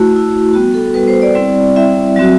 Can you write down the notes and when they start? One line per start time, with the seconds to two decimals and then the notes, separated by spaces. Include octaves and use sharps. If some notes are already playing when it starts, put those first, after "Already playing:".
Already playing: A3 E4 F#4
0.14 A3 E4
0.54 G3 B3 F#4
0.74 A4
0.94 G3 B3 F#4 B4
1.08 C5
1.22 D5
1.35 G3 C4 E4
1.76 G3 C4 E4 E5
2.16 F#3 C4 F#4